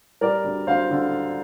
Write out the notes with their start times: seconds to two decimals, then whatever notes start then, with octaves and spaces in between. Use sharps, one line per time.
0.21 G3 A#4 D5
0.44 D2
0.67 D2 C5 F5
0.91 D3